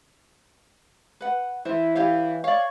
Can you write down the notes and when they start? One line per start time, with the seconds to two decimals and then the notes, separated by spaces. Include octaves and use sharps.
1.21 B4 F#5
1.65 E3 C5 E5
1.96 E3 G4 C#5 F5
2.44 C#5 D5 F5